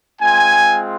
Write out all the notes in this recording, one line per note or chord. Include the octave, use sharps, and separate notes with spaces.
G#3 C4 F4 G#5